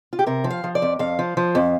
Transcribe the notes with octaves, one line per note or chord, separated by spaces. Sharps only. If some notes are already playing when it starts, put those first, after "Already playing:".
F4
G4
C3 A#4
F3
F5
F3
D5
F2
F2 F5
F3
F3
F2